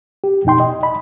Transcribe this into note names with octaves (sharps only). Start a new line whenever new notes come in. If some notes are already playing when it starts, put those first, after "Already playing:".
G4
F2 B2 D#4 G5 C6
D#5
D#5 B5